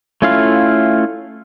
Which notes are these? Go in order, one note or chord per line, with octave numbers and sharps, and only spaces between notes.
A3 C#4 E4 F4 F5